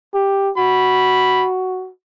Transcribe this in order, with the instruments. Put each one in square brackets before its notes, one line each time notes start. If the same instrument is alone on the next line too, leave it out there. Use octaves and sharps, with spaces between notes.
[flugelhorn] G4
[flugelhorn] F#4 [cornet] B5